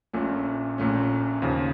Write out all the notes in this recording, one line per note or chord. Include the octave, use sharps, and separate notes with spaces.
A#1 A#2 A3 C#4
A#1 A#2 A3 C#4
D#2 C#3 F3